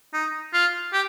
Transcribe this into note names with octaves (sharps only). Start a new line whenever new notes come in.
D#4
F4
G4